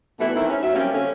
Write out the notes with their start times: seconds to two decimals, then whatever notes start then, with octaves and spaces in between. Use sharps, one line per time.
0.20 B2 E3 G3 A3 B3 E4
0.35 D#3 E3 A3 C4 E4
0.49 C#4
0.62 F#3 E5
0.75 G3 A#3 C4 C#4
0.93 D3 C#4